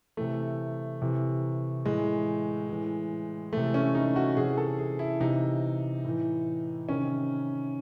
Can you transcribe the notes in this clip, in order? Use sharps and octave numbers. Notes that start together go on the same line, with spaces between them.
C3 E3 A3
C3 E3
A2 E3 G#3
A2 E3
C3 E3 A3
C#4
D#4
F#4
C3 E3 G#4
A4
G#4
E4
C3 E3 D#4
A2 E3
C3 D#3 C#4